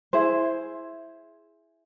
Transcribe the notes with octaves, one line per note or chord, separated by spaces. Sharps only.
E4 G#4 C5